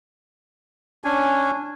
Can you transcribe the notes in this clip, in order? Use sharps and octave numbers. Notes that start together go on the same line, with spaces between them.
C#4 D4 G#5